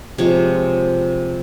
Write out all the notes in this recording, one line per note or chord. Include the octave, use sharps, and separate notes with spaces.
C3 F3 G#3 C#5